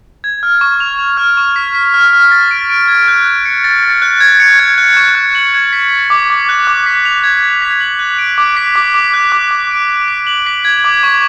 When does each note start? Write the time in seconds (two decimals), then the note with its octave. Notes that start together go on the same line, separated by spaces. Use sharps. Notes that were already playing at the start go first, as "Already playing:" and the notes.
0.24 G#6
0.43 F6
0.61 C#6
0.80 F7
0.99 F7
1.17 F6
1.37 C#6
1.56 B6
1.75 B6
1.94 F6
2.13 F6
2.31 A6
2.51 D7
2.69 D7
2.88 G#6
3.08 F#6
3.26 F#6
3.45 C#7
3.64 A6
3.83 A6
4.02 F#6
4.20 G#6
4.40 C#7
4.59 G#6
4.78 F#6
4.97 C#6
5.15 F#6
5.35 F#7
5.54 G#6
5.73 B6
5.91 A6
6.10 D6
6.30 D6
6.49 F#6
6.67 D6
6.86 B6
7.05 F7
7.24 G#6
7.43 G#6
7.62 B6
7.80 F#7
7.99 F#6
8.18 D7
8.38 D6
8.57 B6
8.76 D6
8.94 D6
9.14 F#6
9.32 D6
9.51 D6
9.71 D7
9.89 B6
10.08 B6
10.27 F#7
10.46 B6
10.65 G#6
10.84 D6
11.03 C#6